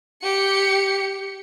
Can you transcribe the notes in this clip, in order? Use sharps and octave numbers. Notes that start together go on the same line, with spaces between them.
G4 C#7